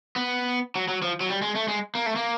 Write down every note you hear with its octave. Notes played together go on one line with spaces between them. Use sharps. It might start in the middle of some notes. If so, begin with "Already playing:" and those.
B3
F#3
F#3
F3
F#3
G3
G#3
A3
G#3
A#3
A3
A#3